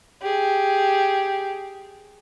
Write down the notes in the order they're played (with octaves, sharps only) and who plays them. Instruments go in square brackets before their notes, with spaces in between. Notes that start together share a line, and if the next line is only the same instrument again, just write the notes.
[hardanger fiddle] G4 G#4